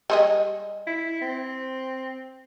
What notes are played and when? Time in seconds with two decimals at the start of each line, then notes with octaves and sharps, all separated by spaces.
0.10 G3 G#3 D#5
0.87 E4
1.21 C4